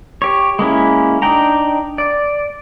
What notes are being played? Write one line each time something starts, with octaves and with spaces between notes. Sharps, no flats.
G4 C#5
G#3 A#3 C#4 E4
D4 D#4 G5 A#5
D5